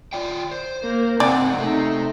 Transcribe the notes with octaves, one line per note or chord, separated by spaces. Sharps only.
F4 D5 G5
C5
A#3
C3 C4 C#4 D#4 D5 F#5 G#5
C3 A3 C4 D#4